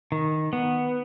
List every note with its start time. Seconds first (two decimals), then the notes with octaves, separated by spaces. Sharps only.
0.12 D#3
0.53 B3